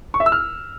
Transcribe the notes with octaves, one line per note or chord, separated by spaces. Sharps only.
C#6
E5
E6
F6